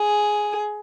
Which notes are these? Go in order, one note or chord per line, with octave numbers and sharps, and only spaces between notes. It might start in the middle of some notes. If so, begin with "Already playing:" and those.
Already playing: G#4